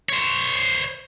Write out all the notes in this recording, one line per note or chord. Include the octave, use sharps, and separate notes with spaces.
C5 C#5